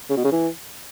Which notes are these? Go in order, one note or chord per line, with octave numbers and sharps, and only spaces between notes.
C#3
B2
C#3
E3